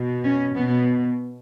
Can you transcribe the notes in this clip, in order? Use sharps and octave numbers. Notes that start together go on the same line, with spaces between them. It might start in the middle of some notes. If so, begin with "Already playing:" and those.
Already playing: B2
C#4
B2 B3